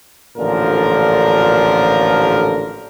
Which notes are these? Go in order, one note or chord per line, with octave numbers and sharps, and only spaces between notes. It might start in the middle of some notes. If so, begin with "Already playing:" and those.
A1 A#2 D3 F3 D4 A#4